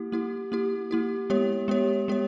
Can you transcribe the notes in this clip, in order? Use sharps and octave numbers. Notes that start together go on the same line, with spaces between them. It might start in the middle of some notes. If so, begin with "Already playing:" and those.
Already playing: A#3 E4 G4
A#3 E4 G4
A#3 E4 G4
A#3 E4 G4
G#3 B3 G4 C#5
G#3 B3 G4 C#5
G#3 B3 G4 C#5